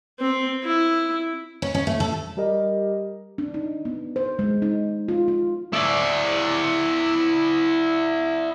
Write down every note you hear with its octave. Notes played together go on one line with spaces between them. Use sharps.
C4
E4
C#4
C#4
A3
A4
G3 G4 A#4 D#5
D4
D#4
B3
C5
G#3
D#4
F4
F4
E4 D5